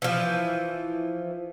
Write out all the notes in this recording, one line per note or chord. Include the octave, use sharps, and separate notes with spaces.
E3 F3